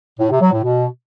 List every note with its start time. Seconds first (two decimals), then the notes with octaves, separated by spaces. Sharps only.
0.20 A2
0.31 C3
0.42 F#3
0.53 A2
0.64 B2